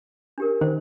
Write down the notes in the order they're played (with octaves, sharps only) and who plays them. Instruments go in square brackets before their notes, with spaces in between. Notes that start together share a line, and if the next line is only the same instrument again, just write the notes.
[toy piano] D4 G4 A#4
[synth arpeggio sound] D#3 [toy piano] C5